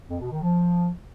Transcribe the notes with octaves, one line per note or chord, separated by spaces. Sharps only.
F2
B2
D#3
F3